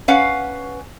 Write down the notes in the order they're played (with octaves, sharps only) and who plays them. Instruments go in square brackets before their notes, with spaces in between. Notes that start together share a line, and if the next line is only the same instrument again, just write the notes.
[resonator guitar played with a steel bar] C#4 B4 F5 F#5